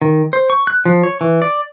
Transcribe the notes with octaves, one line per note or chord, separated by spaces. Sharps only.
D#3
C5
C#6
F#6
F3
C#5
E3
D5